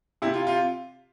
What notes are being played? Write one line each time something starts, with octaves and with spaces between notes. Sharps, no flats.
C3 E4
F4
F4